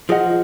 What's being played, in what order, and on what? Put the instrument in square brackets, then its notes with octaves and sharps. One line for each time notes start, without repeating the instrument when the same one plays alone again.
[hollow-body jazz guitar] F3 [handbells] F4 G#4 D#5 F#5